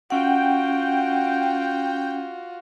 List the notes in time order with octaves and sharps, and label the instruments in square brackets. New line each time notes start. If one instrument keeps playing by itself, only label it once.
[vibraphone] C#4 F#5 [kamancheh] F4 F#4 [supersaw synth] G5